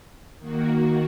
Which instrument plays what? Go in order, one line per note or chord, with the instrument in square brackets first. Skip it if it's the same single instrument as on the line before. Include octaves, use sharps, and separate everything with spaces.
[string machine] D#3 A#3 F#4